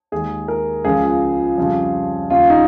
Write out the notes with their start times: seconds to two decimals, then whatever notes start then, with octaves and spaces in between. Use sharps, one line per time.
0.12 D#2 D#3 G#3 G#4
0.48 A#4
0.85 C#2 C#3 F3 G#3 G#4
1.58 F2 C#3 G3
2.30 D#2 C#3 G3 F4
2.50 D#4